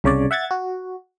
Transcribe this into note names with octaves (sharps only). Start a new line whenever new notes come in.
C2 C#3 C#5 D5
E5 F#5 G#6 A6
F#4